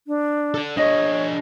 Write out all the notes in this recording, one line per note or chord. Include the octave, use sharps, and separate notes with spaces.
D4
A4 D5
D4 G#4 C#5 D#5